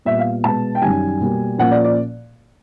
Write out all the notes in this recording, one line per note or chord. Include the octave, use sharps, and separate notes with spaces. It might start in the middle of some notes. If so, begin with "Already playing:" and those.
A#2 G3 B3 E5
F5
B2 G#3 B3 A5
G5
F#2 D#3 G3 G#5
B2 G3 A#3
A#2 F3 A#3 C#4 F#5
D5
D5